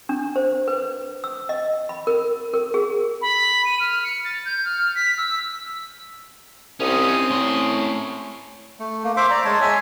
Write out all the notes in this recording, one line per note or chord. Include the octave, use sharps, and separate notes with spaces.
D4
C5
B4
E6
D#5
B5
A#4
A#4
G#4
B5
D#7
F6
C#7
A6
G6
F6
B6
E6
C2 C4 C#4 D#4 D#6
A2 C#4 C6
A3
A3 A#3
C5 E5 C6 D6
D5 A#5
G#3 C#5 A5 C6
C#5 E5 G#5